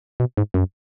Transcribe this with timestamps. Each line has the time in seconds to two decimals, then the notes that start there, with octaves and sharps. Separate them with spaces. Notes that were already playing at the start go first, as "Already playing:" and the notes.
0.20 B2
0.37 G#2
0.54 F#2